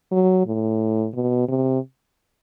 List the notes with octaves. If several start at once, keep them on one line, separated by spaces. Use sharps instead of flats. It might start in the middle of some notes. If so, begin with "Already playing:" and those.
F#3
A2
B2
C3